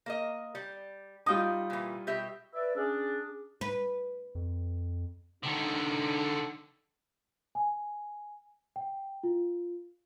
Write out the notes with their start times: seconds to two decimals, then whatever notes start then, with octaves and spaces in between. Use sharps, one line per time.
0.06 A#3 A#4 D#5
0.55 G3
1.26 G3 D#4 F4 G5 D#6
1.70 A#2 E3
2.07 B2 G4 E5
2.54 B4 D5 E5
2.76 C#4 D4 G#4
3.61 B4
4.35 F2
5.43 D3 D#3 D4 D#4
7.55 G#5
8.76 G5
9.23 F4